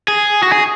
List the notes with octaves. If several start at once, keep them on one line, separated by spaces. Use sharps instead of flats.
G#4
F#4
G#4